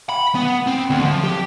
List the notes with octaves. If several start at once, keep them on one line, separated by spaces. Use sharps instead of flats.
B5
B3
C4
D2
F3
G4